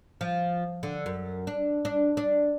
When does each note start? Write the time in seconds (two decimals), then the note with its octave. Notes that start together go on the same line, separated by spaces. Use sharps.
0.21 F3
0.83 D3
1.06 F#2
1.47 D4
1.85 D4
2.17 D4